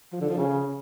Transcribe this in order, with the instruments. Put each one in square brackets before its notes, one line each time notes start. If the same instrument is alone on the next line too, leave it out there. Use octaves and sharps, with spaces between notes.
[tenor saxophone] F3
D3
F3
C#3